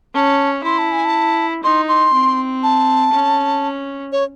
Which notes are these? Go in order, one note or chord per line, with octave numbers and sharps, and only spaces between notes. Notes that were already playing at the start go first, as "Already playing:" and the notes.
C#4 A5
E4 C6
A5
G#5
A5
D#4 C6
C6
C4
A5
C#4
C#5